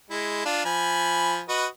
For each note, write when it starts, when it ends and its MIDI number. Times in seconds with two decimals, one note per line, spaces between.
0.10 0.42 56
0.10 0.42 64
0.45 0.64 62
0.45 0.64 65
0.65 1.41 53
0.65 1.41 80
0.65 1.41 83
1.49 1.66 66
1.49 1.66 71
1.49 1.66 75